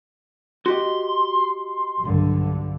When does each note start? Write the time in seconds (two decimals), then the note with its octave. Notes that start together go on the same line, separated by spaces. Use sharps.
0.66 F#4 G4 D#5 C6
2.00 B1 G2 D3